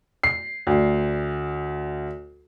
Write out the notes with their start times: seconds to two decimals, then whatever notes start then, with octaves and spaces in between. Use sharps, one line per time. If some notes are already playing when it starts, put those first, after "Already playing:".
0.24 C7
0.67 D2